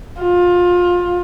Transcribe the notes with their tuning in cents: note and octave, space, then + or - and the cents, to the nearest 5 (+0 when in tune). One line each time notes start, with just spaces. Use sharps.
F4 +20